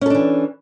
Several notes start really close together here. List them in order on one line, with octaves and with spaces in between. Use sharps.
C#4 A4 D4 E3